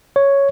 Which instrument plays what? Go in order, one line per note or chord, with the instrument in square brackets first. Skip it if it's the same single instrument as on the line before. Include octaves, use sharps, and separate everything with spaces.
[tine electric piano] C#5